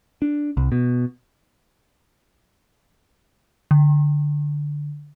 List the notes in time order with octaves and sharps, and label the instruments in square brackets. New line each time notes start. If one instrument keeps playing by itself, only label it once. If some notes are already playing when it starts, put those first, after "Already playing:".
[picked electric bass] D4
C2
B2
[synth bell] D3